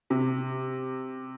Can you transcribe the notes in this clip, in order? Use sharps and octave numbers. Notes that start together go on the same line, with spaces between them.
C3